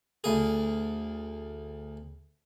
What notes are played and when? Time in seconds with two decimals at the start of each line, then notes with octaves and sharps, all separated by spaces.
0.24 D2 G#4